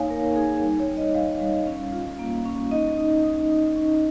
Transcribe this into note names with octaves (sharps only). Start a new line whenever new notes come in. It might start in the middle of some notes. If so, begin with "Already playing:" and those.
Already playing: A#3 D#4 C#5 F5 G#5
A#3 A#4
D#4 G#4
G3
C#5
G3
D#5
G3 F5
G3
C#4
F4
A#3
C#4
D#4 D#5
D#4
D#4
D#4
C#4